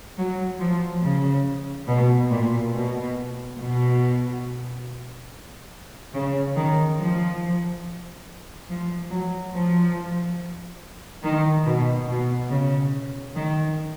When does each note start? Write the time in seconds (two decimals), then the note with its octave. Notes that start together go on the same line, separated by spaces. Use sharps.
0.18 F#3
0.60 F3
1.03 C#3
1.88 B2
2.31 A#2
2.73 B2
3.58 B2
6.13 C#3
6.56 D#3
6.98 F3
8.69 F3
9.10 F#3
9.53 F3
11.23 D#3
11.66 B2
12.08 B2
12.50 C#3
13.36 D#3